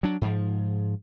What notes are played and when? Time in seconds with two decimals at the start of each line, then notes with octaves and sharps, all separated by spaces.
0.03 F#3 D4
0.21 G#2 F3